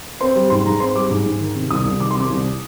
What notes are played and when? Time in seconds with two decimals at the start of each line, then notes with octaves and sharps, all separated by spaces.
0.21 C4 C6
0.36 G3
0.50 G#2 C6
0.65 G#2 A#5
0.80 C4 C6
0.95 G3 D6
1.10 G#2
1.26 G#2
1.40 D#3
1.55 C3
1.71 C2 D#6
1.85 C2
2.00 D#3 D6
2.11 C6
2.16 C3 D6
2.30 C2